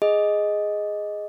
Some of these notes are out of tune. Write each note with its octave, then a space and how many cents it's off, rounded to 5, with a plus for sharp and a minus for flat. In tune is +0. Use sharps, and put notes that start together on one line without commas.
G#4 +0 D#5 +0